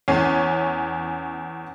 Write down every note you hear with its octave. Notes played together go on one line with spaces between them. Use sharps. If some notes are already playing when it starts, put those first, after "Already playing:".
E2 C#4 G#5